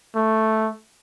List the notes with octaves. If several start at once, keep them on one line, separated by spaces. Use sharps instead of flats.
A3